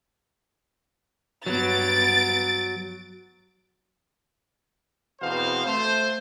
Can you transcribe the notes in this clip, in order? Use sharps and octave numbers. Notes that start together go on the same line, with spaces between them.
G2 F#3 B3 A6 D7
E2 B2 C4 C5 F5
A3 C5